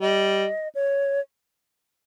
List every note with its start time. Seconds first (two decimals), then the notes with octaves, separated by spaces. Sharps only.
0.01 G3 D#5
0.75 C#5